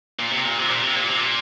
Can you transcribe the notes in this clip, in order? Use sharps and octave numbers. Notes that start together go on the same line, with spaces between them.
A#2
C3
A#2
C3
A#2
C3
A#2
C3
A#2